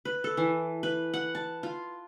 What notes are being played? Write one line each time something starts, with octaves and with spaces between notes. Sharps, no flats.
B4
A4
E3
B4
F#5
A5
F4